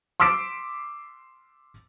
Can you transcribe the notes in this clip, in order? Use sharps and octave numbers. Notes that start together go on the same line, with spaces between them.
C6 D6 E6 B6 D7